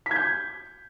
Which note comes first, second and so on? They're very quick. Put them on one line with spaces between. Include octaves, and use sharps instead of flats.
B6 G#6 G6